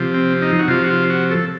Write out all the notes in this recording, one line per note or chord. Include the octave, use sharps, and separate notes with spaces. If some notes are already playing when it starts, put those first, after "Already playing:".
Already playing: C3 F3
C4
D#4
F#4
C3 F3 F4
F#4
F4
F#4
A4